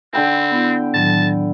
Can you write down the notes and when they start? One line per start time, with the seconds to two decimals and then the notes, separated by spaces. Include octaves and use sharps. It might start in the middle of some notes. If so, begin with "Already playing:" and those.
0.13 D3 C4 G5 B5
0.52 B3 E4
0.94 A2 D#3 F#3 A5